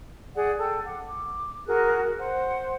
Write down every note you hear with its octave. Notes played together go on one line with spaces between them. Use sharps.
G#4 D5 F#5
A4 G5
F#5 D6
D6
F#4 G#4 A#4 F#6
C5 F#5